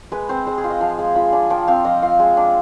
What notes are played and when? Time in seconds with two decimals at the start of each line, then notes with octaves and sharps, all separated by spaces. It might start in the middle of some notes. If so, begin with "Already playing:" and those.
0.12 G#3 B4
0.29 C4 C5
0.47 G#3 C5
0.58 G#4
0.64 F4
0.70 D#5
0.81 F3 F5
0.98 G#3 G#5
1.15 F4 B5
1.33 D4 G#5
1.50 F3 G5
1.68 C4 F5
1.84 F3 D#5
2.02 F4 F5
2.20 G#3
2.37 D4